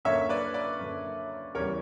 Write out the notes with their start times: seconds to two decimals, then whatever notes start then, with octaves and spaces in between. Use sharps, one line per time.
0.05 F#2 D3 A#3 C#5 E5
0.29 B4 D5
0.54 B4 D5
0.80 F#2 D3 A#3
1.55 E2 C#3 E3 G3 A#4 C#5